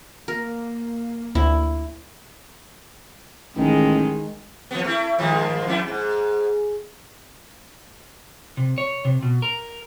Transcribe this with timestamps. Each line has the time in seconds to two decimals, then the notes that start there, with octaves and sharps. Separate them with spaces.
0.28 A#3 A#4
1.35 D2 E4
3.56 A1 D#3 G#3
4.71 F3 A3 B3
4.84 A3 E4
5.19 G2 D#3 F3
5.67 F2 E4
5.88 G#2
8.57 C3
8.78 C#5
9.05 C3
9.23 B2
9.42 A#4